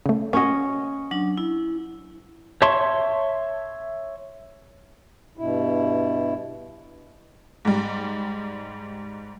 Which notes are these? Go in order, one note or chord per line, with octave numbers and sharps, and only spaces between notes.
C#3 A3
A#3 C#4 F#4 C#5 D#5
F#3 D4
E4
C#5 E5 A5 C6 C#6
G2 B2 E4
G#2 G3